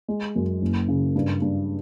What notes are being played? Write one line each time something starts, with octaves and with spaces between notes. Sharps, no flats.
G#3
F#2
F#1
C#3
G2
G2